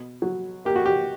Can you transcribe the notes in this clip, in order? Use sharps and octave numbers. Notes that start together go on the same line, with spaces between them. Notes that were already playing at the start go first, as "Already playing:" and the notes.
Already playing: B2
F#3
A#3 G4
F#4
G4